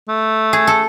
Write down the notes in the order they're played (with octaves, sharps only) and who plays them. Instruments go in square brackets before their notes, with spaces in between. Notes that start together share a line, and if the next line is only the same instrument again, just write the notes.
[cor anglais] A3
[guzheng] G#4
A4